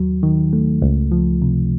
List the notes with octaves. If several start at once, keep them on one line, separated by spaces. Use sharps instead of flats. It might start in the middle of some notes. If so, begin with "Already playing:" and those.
Already playing: D#2 F#3
D#3
A3
C#2
F3
C3